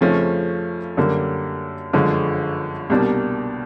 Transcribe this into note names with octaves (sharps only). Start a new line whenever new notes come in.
F2 C#3 F3 A3 C#4
F#2 D3 G3 A#3
G1 F#2 D3 F3 G#3
C2 B2 G3 A#3 D4